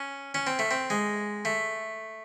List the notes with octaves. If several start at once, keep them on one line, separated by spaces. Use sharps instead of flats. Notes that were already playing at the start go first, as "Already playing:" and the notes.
Already playing: C#4
C#4
C4
A3
C4
G#3
A3